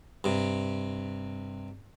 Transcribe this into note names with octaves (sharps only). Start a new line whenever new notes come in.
G2 C3